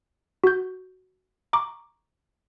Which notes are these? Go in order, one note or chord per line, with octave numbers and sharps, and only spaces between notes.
F#4 G6
A#5 C#6 D6